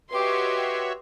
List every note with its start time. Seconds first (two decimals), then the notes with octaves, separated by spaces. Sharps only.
0.11 F#4 G4 B4 C#5 D#5 E5 C6 D6